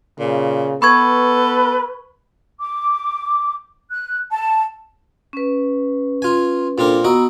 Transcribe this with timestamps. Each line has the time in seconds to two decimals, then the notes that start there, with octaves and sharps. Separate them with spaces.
0.19 A#2 C#3
0.82 B3 A4 B4 B5 C#6 G#6
2.60 D6
3.90 F#6
4.31 A5
5.33 C#4 B4
6.22 F4 G#5
6.78 A#2 C4 D4 A4 A#4
7.04 B3 F#4 D#5 A#5 E6